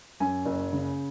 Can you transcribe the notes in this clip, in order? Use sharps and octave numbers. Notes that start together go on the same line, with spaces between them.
F#2 G#5
F#1
C#3